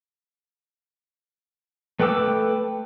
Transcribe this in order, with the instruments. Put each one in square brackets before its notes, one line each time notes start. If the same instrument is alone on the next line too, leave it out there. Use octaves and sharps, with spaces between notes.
[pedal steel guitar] A3 B4 G5 D6 E6